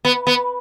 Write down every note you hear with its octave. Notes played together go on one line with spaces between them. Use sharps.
B3
B3